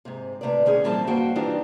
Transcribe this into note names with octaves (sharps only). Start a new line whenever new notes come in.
G#2 C3
A2 C3 B4 D5
D3 D#3 C#4 F#4 G#4
A#2 E3 F3 G3 C4 A5
G2 D#3 A#3 F#4 C5 G5
D#3 E3 G3 D4 D#4 F4